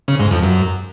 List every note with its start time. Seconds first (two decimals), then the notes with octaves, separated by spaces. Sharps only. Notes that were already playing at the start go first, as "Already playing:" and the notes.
0.08 C#3
0.19 G#2
0.31 F2
0.43 F#2